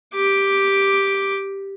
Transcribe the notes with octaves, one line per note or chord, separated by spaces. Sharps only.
G4 D6